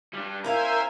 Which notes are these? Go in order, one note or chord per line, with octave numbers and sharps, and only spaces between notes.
G3 D4
C#4 E4 A#4 C5 E5 F5 G#5 A#5